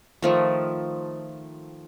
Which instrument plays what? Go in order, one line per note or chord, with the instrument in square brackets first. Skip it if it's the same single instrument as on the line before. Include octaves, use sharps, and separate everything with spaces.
[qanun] D#3 F3 A3